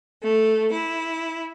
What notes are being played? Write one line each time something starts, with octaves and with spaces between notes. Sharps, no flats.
A3
E4